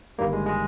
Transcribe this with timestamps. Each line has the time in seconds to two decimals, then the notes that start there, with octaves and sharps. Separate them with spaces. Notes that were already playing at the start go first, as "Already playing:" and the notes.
0.19 G1 G2 D#3 G3 A#3
0.33 G#3
0.46 G#3